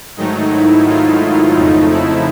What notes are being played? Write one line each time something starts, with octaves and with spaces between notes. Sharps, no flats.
G#2 D#3 F#3 A3 D#4
E4
F4
F2 C#3 F3 A3 D#4
E4